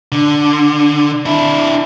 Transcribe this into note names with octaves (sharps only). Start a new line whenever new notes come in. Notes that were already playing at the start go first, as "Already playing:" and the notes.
D3
D4 E4